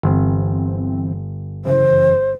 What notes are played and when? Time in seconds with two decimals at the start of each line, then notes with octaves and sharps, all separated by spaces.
0.03 G1 E3 C4
1.65 F#2 C#3 E3 C5